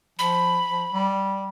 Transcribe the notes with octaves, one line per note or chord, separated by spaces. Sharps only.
F3 B5
F3
G3